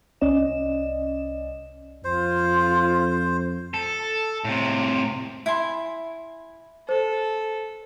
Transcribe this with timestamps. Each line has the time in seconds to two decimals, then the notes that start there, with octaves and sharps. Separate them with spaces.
0.21 C2 C#4 D5 D#5 E7
2.04 F2 F4 C5
3.74 A4
4.44 A2 C3
5.46 E4 G#5 C6
6.89 A4 C5